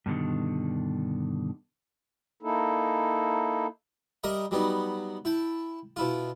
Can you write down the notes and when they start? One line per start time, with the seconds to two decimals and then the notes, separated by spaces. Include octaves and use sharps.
0.06 G2 B2 D3 D#3
2.43 A#3 D#4 E4 A4
4.24 G3 A#4 D#5 E5 A#5
4.51 F#3 G3 B3 D#4
5.25 E4 G5 A5
5.96 B2 E4 F4